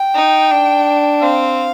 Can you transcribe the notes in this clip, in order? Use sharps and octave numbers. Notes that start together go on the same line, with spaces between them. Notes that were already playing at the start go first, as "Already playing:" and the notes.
Already playing: G5
D#4
D4
C4 F5